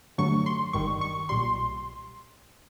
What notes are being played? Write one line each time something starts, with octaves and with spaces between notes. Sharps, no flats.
G2 D3 F#3 A3 C#6
C6
G1 G2 D#3 G3 C#6
C#6
B1 A#2 G3 C6